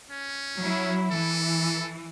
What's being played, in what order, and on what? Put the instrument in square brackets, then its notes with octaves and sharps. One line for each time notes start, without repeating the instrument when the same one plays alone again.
[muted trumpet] C#4
[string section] F#3 E4
[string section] E3 [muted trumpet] A4